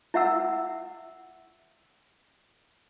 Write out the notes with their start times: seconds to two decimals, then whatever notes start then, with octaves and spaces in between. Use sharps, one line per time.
0.14 E4 E5 F#5 E6